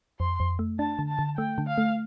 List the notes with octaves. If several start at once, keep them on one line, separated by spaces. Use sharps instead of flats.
F2 C6
F2
A3
D4 A5
D3
A5
D3
A3 G5
D3
F5
A3